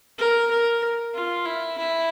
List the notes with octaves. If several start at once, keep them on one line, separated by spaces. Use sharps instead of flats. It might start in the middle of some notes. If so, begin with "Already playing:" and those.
A#4
A#4
F4
E4
E4